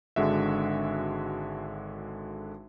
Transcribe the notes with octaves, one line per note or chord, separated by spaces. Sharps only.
G#1 D3 G#3 F#4 E5